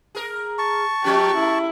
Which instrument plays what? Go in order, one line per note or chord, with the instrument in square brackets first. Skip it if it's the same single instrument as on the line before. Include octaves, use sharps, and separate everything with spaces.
[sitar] G#4 A#4
[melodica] A5 C#6
[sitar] F3 G#3 C#4 [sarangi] G4
[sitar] A3 [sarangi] E4